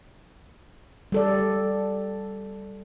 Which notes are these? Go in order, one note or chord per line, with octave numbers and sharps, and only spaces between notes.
G3 A4 D5